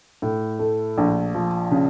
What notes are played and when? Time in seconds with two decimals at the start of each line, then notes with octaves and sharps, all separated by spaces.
0.22 A2
0.59 A3
0.98 A#1
1.35 F3
1.71 C#3